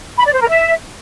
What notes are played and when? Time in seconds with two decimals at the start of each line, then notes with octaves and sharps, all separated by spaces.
0.18 B5
0.25 D5
0.33 C5
0.41 A#4
0.49 E5